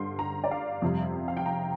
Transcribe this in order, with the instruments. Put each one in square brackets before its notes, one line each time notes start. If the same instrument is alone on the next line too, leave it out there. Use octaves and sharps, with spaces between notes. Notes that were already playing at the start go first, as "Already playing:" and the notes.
Already playing: [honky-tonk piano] G2 D3 C6
A#5
D5
F5
F2 C3 G3
F5
G5
A#5